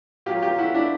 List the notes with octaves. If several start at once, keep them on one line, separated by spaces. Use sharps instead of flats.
A#2 F#3 F4 G4
F4 G4
E4 F#4
D4 E4